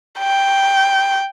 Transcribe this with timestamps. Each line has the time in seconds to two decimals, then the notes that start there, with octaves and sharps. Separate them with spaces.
0.19 G5